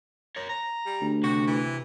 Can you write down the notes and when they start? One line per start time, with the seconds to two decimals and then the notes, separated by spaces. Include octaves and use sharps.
0.36 A#4 C#5
0.49 A#5
0.86 G3
1.01 D2
1.23 C3 F#4
1.47 E3